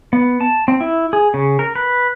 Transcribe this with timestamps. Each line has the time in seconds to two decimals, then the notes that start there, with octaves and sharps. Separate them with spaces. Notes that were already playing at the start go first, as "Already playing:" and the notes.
0.13 B3
0.41 A5
0.68 C4
0.81 E4
1.13 G#4
1.34 C#3
1.59 A#4
1.76 B4